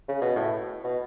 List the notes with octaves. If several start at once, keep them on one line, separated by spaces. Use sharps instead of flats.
C#3
B2
A2
B2